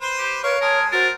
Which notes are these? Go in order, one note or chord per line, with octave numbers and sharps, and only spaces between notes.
B4 C5 C6
G4
A#4 B4 C#5 F5 C#6
G#3 A#4 A5 D#6 G#6
F#4 A#4 C5 A6